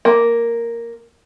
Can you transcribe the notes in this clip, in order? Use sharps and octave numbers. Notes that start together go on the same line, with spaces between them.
A#3